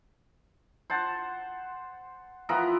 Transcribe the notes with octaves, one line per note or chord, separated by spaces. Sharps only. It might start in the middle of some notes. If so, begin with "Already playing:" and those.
C5 F#5 A5
E3 F3 B3 A#4